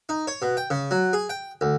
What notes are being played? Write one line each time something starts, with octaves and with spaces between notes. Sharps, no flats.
D#4
C#5
B2
G5
C#3
F#3
G#4
G5
D2